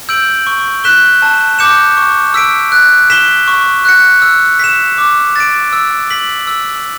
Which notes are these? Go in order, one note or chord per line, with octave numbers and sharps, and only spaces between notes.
E6 G6 D7 F#7
C#6
F#6 B6 E7 G7
A5
D6 G6 C#7 E7
C#6
E6 B6 D7
F#6
B6 E7 G7
C#6
F#6 C#7
E6
B6 E7
D6
A6 D7
E6
B6 F#7
E6